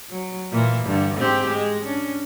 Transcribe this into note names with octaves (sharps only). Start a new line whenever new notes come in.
F#3
A#2 E3 A#3
G2 D3
G#2 C4 G4
G#3
C#4 D4